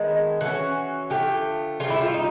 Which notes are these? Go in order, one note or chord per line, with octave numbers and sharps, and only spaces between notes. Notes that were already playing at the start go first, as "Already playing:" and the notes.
Already playing: D#3 G#3 B3 D4
E3 A3 C#4 F#4
D3 F3 A3 G4
C#3 E3 G3 F4
E4
F4
D#4